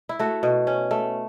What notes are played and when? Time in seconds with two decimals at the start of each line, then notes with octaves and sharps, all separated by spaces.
0.09 E4
0.19 A3 F#4
0.43 B2
0.67 C#4
0.91 A3